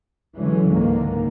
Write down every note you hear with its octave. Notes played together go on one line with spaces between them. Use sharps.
D3 E3 F#3 G#3 C#4
C#2 G#2 D3 D#3 A#3